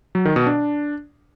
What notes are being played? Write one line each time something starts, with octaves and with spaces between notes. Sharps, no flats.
F#3
D#3
B2
D4